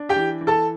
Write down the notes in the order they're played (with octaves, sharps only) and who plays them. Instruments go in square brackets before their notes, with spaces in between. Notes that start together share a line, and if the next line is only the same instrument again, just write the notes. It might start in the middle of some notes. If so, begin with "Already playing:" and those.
Already playing: [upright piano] D4
G4 G5
E3
E3
A4 A5